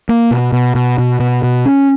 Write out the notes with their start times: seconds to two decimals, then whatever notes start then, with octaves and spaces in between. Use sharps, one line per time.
0.09 A#3
0.31 B2
0.52 B2
0.75 B2
0.98 B2
1.20 B2
1.43 B2
1.66 C#4